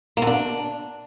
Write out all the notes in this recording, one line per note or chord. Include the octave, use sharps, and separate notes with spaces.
A#3
D3
D4